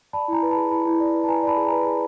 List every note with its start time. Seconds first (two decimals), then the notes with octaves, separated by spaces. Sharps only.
0.13 D5 A5 B5
0.28 E4 G#5 A#5
0.43 B4
0.51 A5 B5
0.57 G#4
0.71 E4 A5 B5
0.86 E4
1.00 D5
1.14 B4
1.24 A5
1.28 B4 G#5 A#5
1.43 D5 A5 B5
1.57 G#4
1.67 G#5 A#5
1.72 B4
1.86 G#4